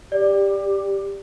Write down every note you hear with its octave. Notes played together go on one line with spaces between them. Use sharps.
G4 D5